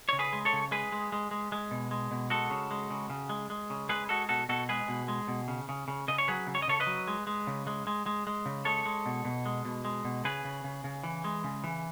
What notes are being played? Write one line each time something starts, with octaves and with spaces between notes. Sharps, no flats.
C#3 C#5
G#4 B4
G#3
A4 C#5
C#3
G#3 G#4 B4
G#3
G#3
G#3
G#3
B2
G#3
B2
G#3 F#4 A4
C#3
G#3
C#3
C#3
G#3
G#3
C#3
G#3 G#4 B4
G#3 F#4 A4
B2 F#4 A4
B2 F#4 A4
G#3 G#4 B4
B2
G#3
B2
C#3
C#3
C#3
C#3 D#5
C#5
F#3 G#4 B4
C#3
C#5
D#5
C#3 A4 C#5
B4 D#5
F#3
G#3
G#3
C#3
G#3
G#3
G#3
G#3
C#3
G#3 A4 C#5
G#3
B2
B2
G#3
B2
G#3
B2
C#3 G#4 B4
C#3
C#3
C#3
E3
G#3
C#3
E3